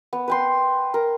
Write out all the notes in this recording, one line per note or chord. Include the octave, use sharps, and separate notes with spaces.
B3
B4 G5 C6
A#4